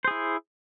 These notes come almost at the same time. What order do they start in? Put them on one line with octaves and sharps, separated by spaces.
C5 G#4 E4